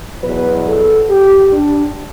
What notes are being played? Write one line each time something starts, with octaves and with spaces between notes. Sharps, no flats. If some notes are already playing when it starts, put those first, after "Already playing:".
E2 B2 F#3 B4
A4
G4
D4